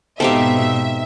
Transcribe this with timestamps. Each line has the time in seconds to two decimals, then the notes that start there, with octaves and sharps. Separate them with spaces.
0.20 G#2 B2 C4 D#4 G4 A4 E5 F5